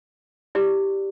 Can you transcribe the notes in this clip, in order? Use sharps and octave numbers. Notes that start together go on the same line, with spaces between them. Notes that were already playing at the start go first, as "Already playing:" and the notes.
E4 G4 D5